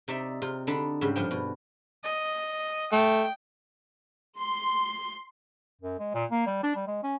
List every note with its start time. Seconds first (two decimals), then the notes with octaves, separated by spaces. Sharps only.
0.08 C3 D#4 D5 E5
0.42 C3 F4
0.67 D3 D4 D#4 B5
1.01 G#2 C#3 G3
1.16 G2 F3 D4 G5
1.31 B2
2.04 D#5
2.92 A3 G5
4.38 C6
5.81 F#2
5.99 G#3
6.14 A#2
6.31 A#3
6.47 G3
6.63 D4
6.76 G3
6.87 G#3
7.03 C#4